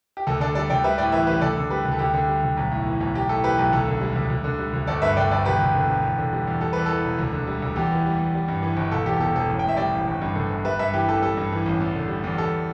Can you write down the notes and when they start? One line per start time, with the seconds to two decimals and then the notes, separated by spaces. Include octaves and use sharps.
0.17 G4
0.27 D2 A4
0.40 D3 A4 D5
0.55 G3 A4 D5
0.70 D2 D5 G5
0.84 G3 B4 E5
0.98 A2 D5 G5
1.12 E3 B4 E5
1.27 A1 G4 B4
1.41 D2 A4 D5
1.56 D3
1.70 G3 G4 B4
1.85 D2
1.92 A4
1.99 D2 G4
2.14 D3
2.28 G3
2.43 D2
2.57 B1
2.71 A2
2.86 E3
3.00 B1
3.15 B1 G4
3.29 A2 A4
3.44 E3 G4 B4
3.58 B1 G4
3.72 D2 A4
3.87 D3
4.01 G3
4.16 D2
4.30 D2
4.44 D3
4.59 G3
4.73 D2
4.87 G1 A4 D5
5.02 G2 B4 E5
5.17 D3 D5 G5
5.31 G1 A4 D5
5.45 E1 G4 B4
5.59 D2
5.75 D3
5.89 E1
6.03 E2
6.18 D3
6.33 G3
6.47 E2
6.61 G3 A4
6.73 E2 B4
6.86 E3 A4
7.04 E1
7.18 D2
7.33 D3
7.47 G3
7.62 D2
7.76 E2 G4
7.91 E3
8.06 G3
8.19 E2
8.35 G3
8.48 G2
8.62 E3
8.77 G1
8.92 E1 A4
9.06 E2 G4
9.20 B2 A4
9.35 E1 A4
9.49 A1
9.59 G5
9.64 A2 E5
9.77 G3 D5 G5
9.93 A1
10.07 G1
10.22 G2
10.36 D3
10.50 G1
10.64 G3 B4 E5
10.79 G2 B4 E5
10.93 E3 G4
11.08 A1 A4
11.22 G3 A4
11.37 G2
11.52 E3
11.66 A1
11.80 E2
11.95 D3
12.08 G3
12.23 E2
12.38 G3 A4